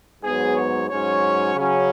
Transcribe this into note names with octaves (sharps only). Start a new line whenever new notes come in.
G#2 F#3 B3 G#4
C#5
G#2 F#3 C#4 C#5
C#3 F#3 C#4